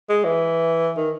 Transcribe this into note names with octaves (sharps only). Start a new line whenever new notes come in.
G#3
E3
D#3